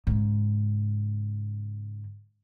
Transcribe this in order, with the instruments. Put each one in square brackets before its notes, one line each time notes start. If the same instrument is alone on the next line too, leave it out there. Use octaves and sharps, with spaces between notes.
[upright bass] G#2 C#3